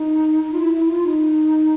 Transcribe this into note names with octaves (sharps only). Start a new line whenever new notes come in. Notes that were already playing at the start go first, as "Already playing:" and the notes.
Already playing: D#4
F4
E4
E4
F4
D#4